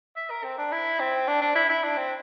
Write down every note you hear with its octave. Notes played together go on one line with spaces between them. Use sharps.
E5
A#4
C4
D4
E4
C4
D4
D4
E4
E4
D4
C4